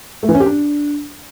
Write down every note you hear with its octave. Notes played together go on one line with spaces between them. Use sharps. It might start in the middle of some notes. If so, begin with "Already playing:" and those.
A3
E3
C#4
G4
D4